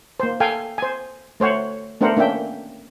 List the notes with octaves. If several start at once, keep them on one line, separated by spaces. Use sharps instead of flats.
A#3 C5
A4 F5 G5 G#5
C5 G#5
A3 C5 C#5 F#5
A3 B3 D4 A#4 C5 F#5
A#3 C#4 D4 E5 G5